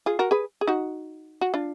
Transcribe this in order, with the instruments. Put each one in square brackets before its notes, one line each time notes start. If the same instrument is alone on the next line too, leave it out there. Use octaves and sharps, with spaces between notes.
[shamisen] F4 G#4
F#4 A#4
G#4 B4
G#4
D#4 F#4
F#4
D4 F4